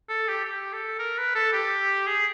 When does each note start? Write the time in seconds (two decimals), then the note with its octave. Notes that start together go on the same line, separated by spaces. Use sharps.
0.09 A4
0.28 G4
0.45 G4
0.73 A4
0.99 A#4
1.18 B4
1.35 A4
1.53 G4
2.07 G#4